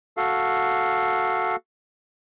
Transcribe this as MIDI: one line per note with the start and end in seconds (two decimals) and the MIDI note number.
0.17 1.56 66
0.17 1.56 69
0.17 1.56 77